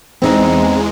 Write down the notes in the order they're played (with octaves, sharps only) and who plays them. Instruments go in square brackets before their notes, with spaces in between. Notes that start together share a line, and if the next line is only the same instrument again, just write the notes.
[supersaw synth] E2 G#3 [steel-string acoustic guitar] C4 D#4